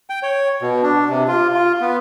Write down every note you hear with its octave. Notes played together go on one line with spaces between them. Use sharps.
G5
C#5
B2
D4
C3
F4
F4
B3